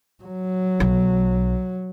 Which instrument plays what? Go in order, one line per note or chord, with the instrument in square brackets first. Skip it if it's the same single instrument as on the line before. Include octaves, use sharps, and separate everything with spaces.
[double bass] F#3
[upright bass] B1